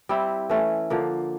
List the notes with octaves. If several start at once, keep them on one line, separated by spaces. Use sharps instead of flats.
G3 C4 E4
E3 A3 C#4
D3 F3 A#3